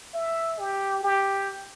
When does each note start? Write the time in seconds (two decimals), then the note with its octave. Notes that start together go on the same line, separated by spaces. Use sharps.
0.14 E5
0.59 G4
1.03 G4